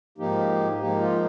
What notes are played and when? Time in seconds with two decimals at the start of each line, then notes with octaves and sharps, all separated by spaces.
0.18 G#2 F3 A#3 D#4 G4
0.80 G#2 F3 A#3 D#4 G4
1.01 F4